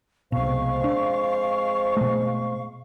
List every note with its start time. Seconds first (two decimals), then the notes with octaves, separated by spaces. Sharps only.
0.32 C2 F2 B2 G#3 C5 F5 C#6
0.84 D4
1.97 B2 A3